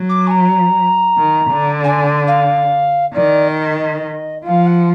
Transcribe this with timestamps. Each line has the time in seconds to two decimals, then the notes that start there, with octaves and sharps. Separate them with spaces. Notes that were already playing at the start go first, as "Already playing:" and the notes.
Already playing: F#3
0.09 D6
0.27 G#5
0.31 A#5
1.18 D#3
1.50 D3
1.84 G#5
2.27 F5
3.14 D#3 D5
3.47 D#5
4.45 F3 F5
4.67 F#5